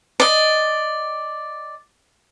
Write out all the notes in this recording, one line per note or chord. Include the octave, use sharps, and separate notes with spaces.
D5 D#5